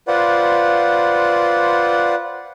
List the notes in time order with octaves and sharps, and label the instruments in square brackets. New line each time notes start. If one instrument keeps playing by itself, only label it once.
[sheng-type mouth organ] F4 B4 C5 D5 F#5